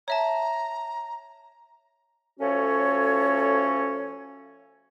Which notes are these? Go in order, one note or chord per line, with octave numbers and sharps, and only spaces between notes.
C#5 E5 A5 A#5
F3 A3 C#4 F#4 A4 C#5